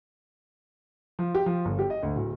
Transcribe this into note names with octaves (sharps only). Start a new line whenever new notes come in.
F3
G4
F3
G1
G4
D#5
D2
D1